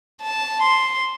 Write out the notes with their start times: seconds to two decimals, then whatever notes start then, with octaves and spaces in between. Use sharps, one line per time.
0.22 A5
0.62 C6